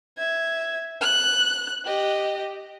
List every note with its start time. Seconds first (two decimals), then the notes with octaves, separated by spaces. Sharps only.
0.17 E5 G#6
1.01 F#6
1.85 G4 D#5